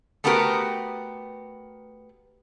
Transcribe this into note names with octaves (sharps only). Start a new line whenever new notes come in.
A3 B3 F#4 G4 A#4 B4